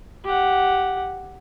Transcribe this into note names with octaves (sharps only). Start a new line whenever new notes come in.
G4 F#5